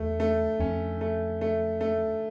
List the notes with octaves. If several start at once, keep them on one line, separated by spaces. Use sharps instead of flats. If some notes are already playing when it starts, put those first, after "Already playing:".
Already playing: E2 A3
A3
F2 C#4
A3
A3
A3